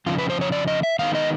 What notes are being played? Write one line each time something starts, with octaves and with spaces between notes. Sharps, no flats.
F2 C#3 F3 F4
B4
C5
C#5
D5
D#5
E5
D#3 G#3 B3 D#4 F5
D#5